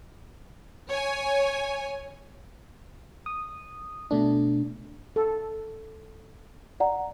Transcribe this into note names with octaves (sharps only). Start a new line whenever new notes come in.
C#5 G#5
D#6
B2 A3 D4
A4
D5 F#5 A#5